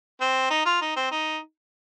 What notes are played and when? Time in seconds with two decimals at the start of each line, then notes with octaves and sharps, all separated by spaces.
0.21 C4
0.50 D#4
0.66 F4
0.82 D#4
0.96 C4
1.11 D#4